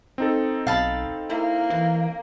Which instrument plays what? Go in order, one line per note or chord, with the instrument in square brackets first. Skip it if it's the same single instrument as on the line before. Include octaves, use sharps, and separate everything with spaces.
[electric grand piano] C4 D#4 A4
[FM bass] B1 [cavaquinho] F5 A5 B5
[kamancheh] A#3 [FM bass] E4
[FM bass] E3